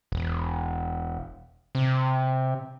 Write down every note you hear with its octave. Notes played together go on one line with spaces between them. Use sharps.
E1
C3